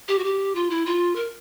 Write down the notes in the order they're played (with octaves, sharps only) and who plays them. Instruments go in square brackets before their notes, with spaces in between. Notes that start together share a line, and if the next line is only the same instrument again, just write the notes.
[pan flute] G4
F#4
G4
F4
E4
F4
A#4